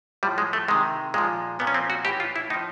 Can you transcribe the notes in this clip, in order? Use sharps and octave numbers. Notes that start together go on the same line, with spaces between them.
A2 F3 G3
G#3
A3
C3 D#3 G#3
A#2 F3 G#3
A#2 F3 B3
C#4
C4
F#4
A2 E3 G4
F4
E4
A2 F3 D#4